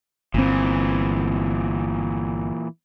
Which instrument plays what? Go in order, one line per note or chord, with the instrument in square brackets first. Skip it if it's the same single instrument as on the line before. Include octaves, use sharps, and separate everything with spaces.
[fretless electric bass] G1 C4 [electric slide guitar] A#2 E3